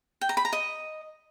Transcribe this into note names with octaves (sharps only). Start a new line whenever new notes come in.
G5
A#5
B5
A#5
D#5